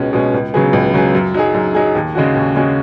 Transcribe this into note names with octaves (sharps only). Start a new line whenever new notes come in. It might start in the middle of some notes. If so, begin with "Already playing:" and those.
Already playing: C#2 B2 G#3 C#4
B2 G#3 C#4
C#2
C#3 F#3 B3 G#4
C#2
C#3 F#3 B3 G#4
F#2
F#3 D#4 G#4
F#2
F#3 D#4 G#4
D#2
C#3 G#3 C#4 F#4
D#2
C#3 G#3 C#4 F#4